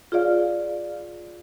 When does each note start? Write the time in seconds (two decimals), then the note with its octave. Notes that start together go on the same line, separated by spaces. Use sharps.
0.12 F4 G#4 C#5 D5 F5